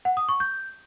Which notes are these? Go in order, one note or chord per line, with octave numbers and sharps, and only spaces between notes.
F#5
D#6
C#6
G6